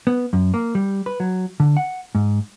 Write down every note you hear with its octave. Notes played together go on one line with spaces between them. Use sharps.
B3
F#2
A#3
G3
B4
F#3
D3
F#5
G#2